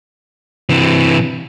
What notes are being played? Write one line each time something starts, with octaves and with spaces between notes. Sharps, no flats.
C3 E3